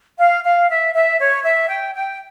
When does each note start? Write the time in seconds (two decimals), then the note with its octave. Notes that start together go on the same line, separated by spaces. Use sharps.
0.18 F5
0.44 F5
0.69 E5
0.94 E5
1.19 C#5
1.44 E5
1.69 G5
1.95 G5